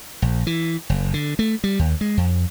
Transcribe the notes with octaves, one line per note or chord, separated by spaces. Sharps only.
A#1
E3
F#1
D3
A3
G3
D#2
G#3
F2